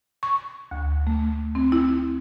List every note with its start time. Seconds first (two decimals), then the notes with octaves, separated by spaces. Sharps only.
0.23 C#6
0.71 D2
1.07 A3
1.55 C4
1.72 E4